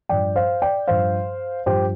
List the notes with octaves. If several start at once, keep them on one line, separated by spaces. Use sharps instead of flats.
G2 F3 D5 G5
C5 F5
D5 G5
G2 F3 C5 F5
G2 F3 G4 C5